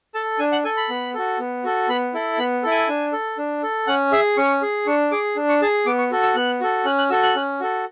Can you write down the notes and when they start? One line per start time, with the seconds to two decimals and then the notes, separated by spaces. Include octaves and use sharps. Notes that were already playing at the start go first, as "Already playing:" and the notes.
0.15 A4 A5
0.39 D4 G#5
0.52 F#5
0.65 A4 G#5
0.77 B5
0.90 B3
1.14 F#4 A4
1.39 B3
1.64 F#4 A4
1.89 B3 B5
2.14 E4 A4
2.39 B3 B5
2.63 E4 A4
2.71 G#5
2.88 D4
3.13 A4
3.38 D4
3.63 A4
3.87 C#4 F#5
4.12 G#4 E5
4.37 C#4 C#6
4.62 G#4
4.87 D4 C#6
5.11 G#4 D6
5.36 D4
5.49 C#6
5.62 G#4 A5
5.86 B3 D6
5.99 C#6
6.11 F#4 A4
6.23 E6
6.36 B3 F#6
6.61 F#4 A4
6.85 C#4 F#6
6.99 F#6
7.10 F#4 A4 E6
7.23 F#6
7.36 C#4
7.60 F#4 A4